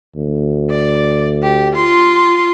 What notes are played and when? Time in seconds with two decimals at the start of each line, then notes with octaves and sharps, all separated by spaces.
0.16 D2
0.70 D5
1.43 G4
1.76 F4 C6